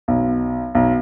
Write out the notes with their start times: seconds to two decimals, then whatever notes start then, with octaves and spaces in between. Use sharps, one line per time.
0.08 B1
0.75 B1